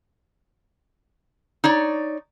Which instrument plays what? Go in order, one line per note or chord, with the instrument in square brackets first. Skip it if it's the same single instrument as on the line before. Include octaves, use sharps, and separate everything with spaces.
[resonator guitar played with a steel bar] D#4 C#5 D5